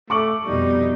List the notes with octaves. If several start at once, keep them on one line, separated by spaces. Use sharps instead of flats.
A3 C#6 D6 F#7
F2 B2 G3 D#4